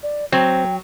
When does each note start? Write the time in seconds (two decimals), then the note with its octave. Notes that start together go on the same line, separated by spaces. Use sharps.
0.03 D5
0.32 F#3 C4 G5